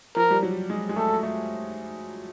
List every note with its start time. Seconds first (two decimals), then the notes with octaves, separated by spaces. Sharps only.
0.16 F3 A#4
0.30 G3
0.43 F#3
0.70 G#3
0.89 G#3
0.96 A3 A4
1.23 A3